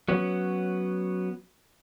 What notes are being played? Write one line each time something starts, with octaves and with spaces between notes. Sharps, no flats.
F#3 B3 C#4